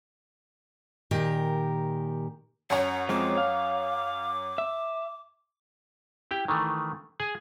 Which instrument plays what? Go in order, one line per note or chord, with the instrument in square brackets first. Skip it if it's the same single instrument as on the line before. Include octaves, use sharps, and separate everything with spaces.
[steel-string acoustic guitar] A#2 D#3 G4 A#4
[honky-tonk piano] F#2 C#5 [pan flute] F#5
[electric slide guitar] F3 G#3 C4 [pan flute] D6
[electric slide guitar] F5
E5
[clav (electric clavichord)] E4 G4 G5
D#3 E3 A3
G#4 G#5